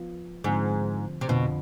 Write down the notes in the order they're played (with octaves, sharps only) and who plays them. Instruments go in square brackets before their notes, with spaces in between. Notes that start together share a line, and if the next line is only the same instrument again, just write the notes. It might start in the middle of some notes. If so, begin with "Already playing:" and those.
Already playing: [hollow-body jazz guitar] F3 B3 F4
[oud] G#2 [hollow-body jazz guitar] D3 F3 C4
[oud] C3
[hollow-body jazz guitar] F2 D3 F3 [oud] B2